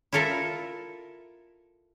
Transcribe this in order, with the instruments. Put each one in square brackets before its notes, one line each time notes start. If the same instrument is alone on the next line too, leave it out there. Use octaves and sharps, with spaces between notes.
[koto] E4 F4 A4 A#4 E5